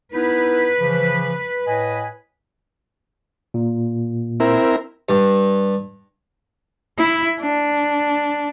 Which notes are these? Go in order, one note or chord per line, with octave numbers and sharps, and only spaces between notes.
B3 D#4 E4 B4
C#3 E3 F3
A2 D#5 G#5
A#2
C4 E4 A#4
G2
E4
D4